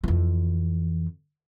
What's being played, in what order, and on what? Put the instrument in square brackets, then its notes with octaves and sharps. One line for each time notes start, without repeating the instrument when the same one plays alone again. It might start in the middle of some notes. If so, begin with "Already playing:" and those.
[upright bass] F2 E3